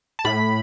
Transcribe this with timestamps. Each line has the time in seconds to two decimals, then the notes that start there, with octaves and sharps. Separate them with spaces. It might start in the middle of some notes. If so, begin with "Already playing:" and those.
0.19 A5
0.25 A2 B5